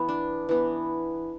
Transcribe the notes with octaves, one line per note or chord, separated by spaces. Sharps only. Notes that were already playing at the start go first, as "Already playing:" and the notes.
Already playing: E3 B3
D4
E3 B3